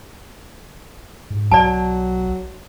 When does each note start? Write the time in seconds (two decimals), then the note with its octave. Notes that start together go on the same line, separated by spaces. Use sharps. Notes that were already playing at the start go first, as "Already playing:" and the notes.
1.30 G#2
1.52 B1 F#3 D5 A5